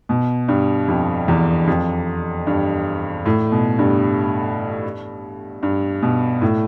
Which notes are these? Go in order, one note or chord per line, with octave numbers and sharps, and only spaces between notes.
B2
G2
F2
E2
F2
G2
A2
B2
G2
G2
B2
A2